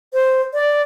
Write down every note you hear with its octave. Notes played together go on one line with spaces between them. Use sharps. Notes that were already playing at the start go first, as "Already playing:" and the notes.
C5
D5